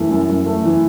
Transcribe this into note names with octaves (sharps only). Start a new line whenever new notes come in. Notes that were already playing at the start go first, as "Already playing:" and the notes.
Already playing: F#2 E3 A3
F#2
F#2
A3
E3